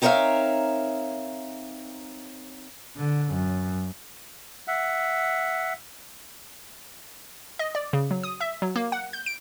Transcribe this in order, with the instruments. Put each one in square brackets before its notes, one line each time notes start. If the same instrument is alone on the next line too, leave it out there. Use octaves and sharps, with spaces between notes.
[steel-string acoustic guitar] C4 D#4 A#4 C#5 E5 F5
[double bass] D3
F#2
[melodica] E5 F#5
[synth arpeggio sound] D#5
D5
C#3
F#3
D#6
E5
F#3
A#3
F#5
G6
D7